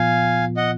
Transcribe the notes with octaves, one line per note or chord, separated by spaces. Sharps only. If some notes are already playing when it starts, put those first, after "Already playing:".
Already playing: A#2 F3 B3 F4 F5 G#5
D#5 F#5